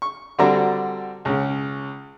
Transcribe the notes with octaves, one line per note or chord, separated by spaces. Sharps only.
C#6
D3 G3 C4 D4 F#4 A#5
C#2 C#3